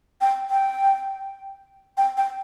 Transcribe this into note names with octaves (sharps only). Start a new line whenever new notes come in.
G5
G5
G5
G5